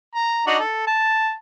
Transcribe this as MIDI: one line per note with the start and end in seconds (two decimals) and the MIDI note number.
0.15 0.45 82
0.47 0.59 62
0.47 0.59 63
0.47 0.59 66
0.59 0.84 69
0.87 1.34 81